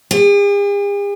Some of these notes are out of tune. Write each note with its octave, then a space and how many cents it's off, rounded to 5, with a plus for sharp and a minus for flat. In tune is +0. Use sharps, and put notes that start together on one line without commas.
G#4 -45